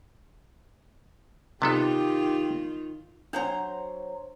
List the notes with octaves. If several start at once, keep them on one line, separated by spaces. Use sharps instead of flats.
C3 D#3 B3 D#4 F4 G4 A4
F#3 D4 C5 C#5 A#5